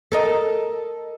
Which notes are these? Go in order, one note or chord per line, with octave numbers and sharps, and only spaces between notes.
A4 A#4 D#5